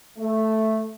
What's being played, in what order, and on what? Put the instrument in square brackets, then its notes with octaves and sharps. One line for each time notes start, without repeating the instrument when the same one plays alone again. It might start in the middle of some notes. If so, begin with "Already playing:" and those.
[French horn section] A3